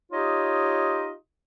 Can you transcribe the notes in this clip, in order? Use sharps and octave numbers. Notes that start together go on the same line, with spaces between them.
D#4 F4 G4 C#5 D#5